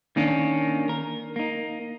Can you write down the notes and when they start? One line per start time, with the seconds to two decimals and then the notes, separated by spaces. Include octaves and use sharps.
0.16 D#3 A#3 C#4 D4
0.89 A#4
1.36 A#3 D#4